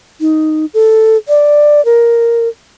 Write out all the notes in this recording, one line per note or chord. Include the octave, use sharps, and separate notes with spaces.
D#4
A4
D5
A#4